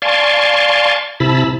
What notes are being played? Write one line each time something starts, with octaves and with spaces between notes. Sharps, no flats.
D5 F5 G#5 A5 C6 C#6
C3 E4 A5 B5